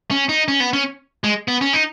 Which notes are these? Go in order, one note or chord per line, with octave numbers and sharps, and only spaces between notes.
C#4
D#4
C#4
B3
C#4
G#3
B3
C#4
D#4